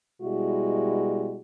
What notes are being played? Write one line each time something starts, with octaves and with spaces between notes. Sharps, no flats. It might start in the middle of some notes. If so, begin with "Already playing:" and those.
B2 G3 G#3 E4 F#4